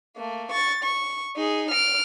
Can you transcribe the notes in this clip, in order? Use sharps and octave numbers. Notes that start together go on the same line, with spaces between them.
A3 A#3
C#6 A6
C#6
D#4 G#4
F6 D7